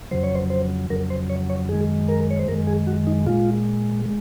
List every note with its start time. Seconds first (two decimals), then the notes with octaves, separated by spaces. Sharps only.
0.11 F2 C#3 F#3 C5
0.23 C#5
0.35 C5
0.50 C5
0.90 F2 C#3 F#3 A#4
1.10 C5
1.30 C#5
1.50 C#5
1.69 F#2 D#3 G#3 G#4
2.08 A#4
2.30 C#5
2.39 C5
2.48 F#2 D#3 G#3 A#4
2.67 G#4
2.87 F#4
3.07 D#4
3.27 A#2 G#3 F4
4.05 G#3